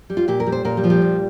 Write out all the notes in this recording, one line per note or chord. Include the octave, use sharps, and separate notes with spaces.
G3
F4
A#2 G4
A#4
G3
C5
A#2 A#4
G3
F3
G3
A#2